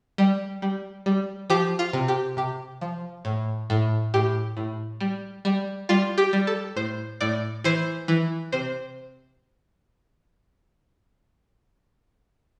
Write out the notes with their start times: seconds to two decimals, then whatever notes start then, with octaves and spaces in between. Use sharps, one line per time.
0.18 G3
0.62 G3
1.06 G3
1.50 F3 G4
1.79 F4
1.93 C3
2.08 G4
2.37 C3 G4
2.81 F3
3.25 A2
3.70 A2
4.14 A2 G4
4.57 A2
5.01 G3
5.45 G3
5.89 G3 F4
6.18 G4
6.33 G3
6.47 A4
6.76 A2 C5
7.21 A2 D5
7.64 E3 C5
8.08 E3
8.52 C3 C5